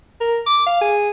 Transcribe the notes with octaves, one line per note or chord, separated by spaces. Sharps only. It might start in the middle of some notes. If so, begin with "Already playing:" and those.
A#4
D6
F5
G#4